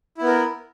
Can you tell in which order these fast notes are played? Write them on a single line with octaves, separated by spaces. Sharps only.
E4 B3 A#4